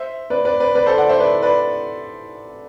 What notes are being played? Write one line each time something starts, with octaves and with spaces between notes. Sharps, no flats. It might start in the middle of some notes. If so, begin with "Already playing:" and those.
Already playing: C5 E5
B4 D5
B4 D5
B4 D5
B4 D5
A4 C5
D5 F#5
C5 E5
B4 D5
B4 D5